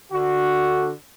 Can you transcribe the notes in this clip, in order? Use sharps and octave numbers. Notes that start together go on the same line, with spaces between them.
D3 F#4